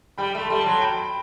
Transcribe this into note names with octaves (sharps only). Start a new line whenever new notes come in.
G3 G5 B5
A3 A5 C6
G3
A5 C6
F#3
G5 B5